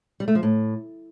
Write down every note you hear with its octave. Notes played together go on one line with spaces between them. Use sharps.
G3
A3
F3
A2